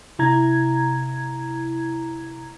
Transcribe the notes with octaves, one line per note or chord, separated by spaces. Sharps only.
C3 E4 A#5 G#6